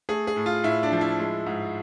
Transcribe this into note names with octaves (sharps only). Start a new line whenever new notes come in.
A3 G#4
G#4
A2
F4
A2 E4
D4
F3
E4
G#3
G#2